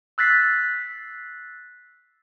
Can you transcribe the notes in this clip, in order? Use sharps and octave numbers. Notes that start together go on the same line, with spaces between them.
E6 F#6 A6 B6 C7